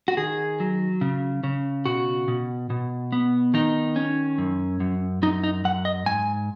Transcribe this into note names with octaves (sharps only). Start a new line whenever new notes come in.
F#4
D#3 G#4
F#3
C#3
C#3
B2 F#4
B2
B2
B3
D#3 D#4
C#4
F#2
F#2
F#2 D#4
D#4
F#2 F#5
D#5
G#2 G#5